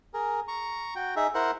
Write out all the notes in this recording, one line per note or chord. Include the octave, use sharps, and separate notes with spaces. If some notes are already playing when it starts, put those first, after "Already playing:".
G#4 A#4
A#5 C#6
F#4 G5
D#4 G#4 E5
E4 A#4 C5 F#5